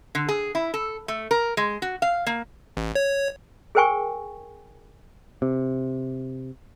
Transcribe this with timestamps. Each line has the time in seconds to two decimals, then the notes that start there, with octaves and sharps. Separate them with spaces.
0.15 D3
0.29 G#4
0.55 E4
0.74 A4
1.08 A3
1.31 A#4
1.57 G#3
1.82 F#4
2.02 F5
2.26 A#3
2.77 A1
2.95 C#5
3.75 G#4 A#4 C5 G5 G#5 C#6
5.42 C3